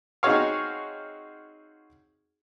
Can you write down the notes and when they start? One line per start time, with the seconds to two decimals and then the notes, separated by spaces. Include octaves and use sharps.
0.23 C4 D#4 F#4 G#4 C#5 F5